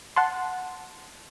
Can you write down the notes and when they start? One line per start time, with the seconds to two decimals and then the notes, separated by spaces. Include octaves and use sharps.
0.16 F#5 A5 C6